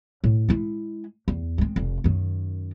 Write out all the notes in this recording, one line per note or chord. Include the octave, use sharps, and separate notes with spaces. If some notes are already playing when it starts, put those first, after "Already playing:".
A2
G#3 E4
E2
G#3 C4
F1
F#2 D#3